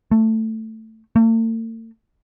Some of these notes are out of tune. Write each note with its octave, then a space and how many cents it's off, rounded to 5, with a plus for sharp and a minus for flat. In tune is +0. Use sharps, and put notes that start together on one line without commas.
A3 +10
A3 +45